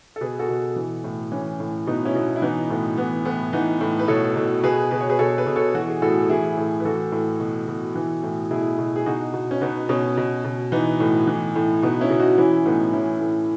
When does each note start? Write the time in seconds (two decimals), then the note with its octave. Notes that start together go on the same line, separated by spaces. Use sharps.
0.16 A4
0.21 B2 G#4 B4
0.39 F#4 A4
0.49 B2
0.76 E3
1.04 A2
1.32 E3 C#4
1.60 A2
1.87 B2 B3 D#4
2.05 C#4 E4
2.15 B2
2.36 E4
2.42 E3 B3 D#4
2.70 A2 B3
2.98 E3 B3
3.25 A2 B3
3.53 E3 B3 D#4
3.81 A2
3.99 B4
4.08 B2 A4 C#5
4.36 B2
4.63 B2 G#4 B4
4.91 B2 B4
5.01 C#5
5.10 G#4 B4
5.19 B2 A4 C#5
5.38 G#4 B4
5.47 B2
5.56 A4 C#5
5.74 E3 F#4
5.89 G#4
6.02 A2 F#4 A4
6.29 E3 E4 G#4
6.57 A2
6.80 B4
6.85 E3 F#4 A4
7.12 A2
7.40 B2
7.68 B2
7.95 E3
8.23 A2
8.51 B2 E4 G#4
8.78 B2
8.96 G#4
9.06 B2 D#4 F#4
9.34 B2
9.51 C#4
9.61 B2 B3 D#4
9.89 B2 C#4
10.17 B2
10.44 B2
10.72 E3 B3 D#4
11.00 A2
11.27 E3
11.56 A2
11.83 B2 B3 D#4
12.01 C#4 E4
12.10 B2
12.20 D#4 F#4
12.38 E3 C#4 E4
12.66 A2 B3 D#4
12.93 E3 C#4 E4
13.21 A2